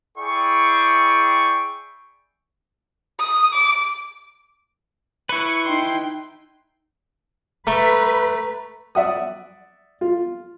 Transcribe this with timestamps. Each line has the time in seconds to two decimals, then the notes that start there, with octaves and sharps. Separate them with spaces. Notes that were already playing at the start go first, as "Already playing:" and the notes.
0.18 E4 G#4 D5 G5 C#6
3.19 D#6
3.52 D6
5.29 E4 B4 C#6
5.66 D#4 G5 C6
7.67 A3 B4 A#5
8.95 D5 E5 F#5 D#6
10.01 F4